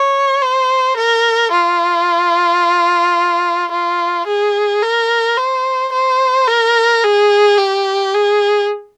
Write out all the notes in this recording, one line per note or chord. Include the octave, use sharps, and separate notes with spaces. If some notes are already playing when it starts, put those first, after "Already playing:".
Already playing: C#5
C5
A#4
F4
F4
G#4
A#4
C5
C5
A#4
G#4
G4
G#4